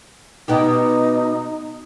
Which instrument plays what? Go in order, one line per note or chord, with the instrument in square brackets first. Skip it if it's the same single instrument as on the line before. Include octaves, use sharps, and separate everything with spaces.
[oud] B2 B3 G4 [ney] D#4